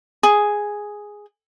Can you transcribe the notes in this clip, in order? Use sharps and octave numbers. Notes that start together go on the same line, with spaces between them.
G#4